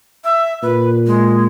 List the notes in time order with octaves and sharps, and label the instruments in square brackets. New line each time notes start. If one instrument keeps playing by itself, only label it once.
[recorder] E5
[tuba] A#2 [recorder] B4
[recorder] G#3